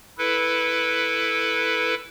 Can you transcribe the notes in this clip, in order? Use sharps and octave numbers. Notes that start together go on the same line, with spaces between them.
E4 A4 B4